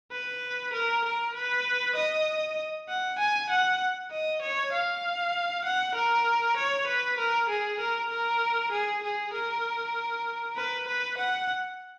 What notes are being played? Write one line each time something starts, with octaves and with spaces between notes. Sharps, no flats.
B4
A#4
A#4
B4
D#5
F#5
G#5
F#5
D#5
C#5
F5
F#5
A#4
C#5
B4
A#4
G#4
A#4
A#4
G#4
G#4
A#4
B4
B4
F#5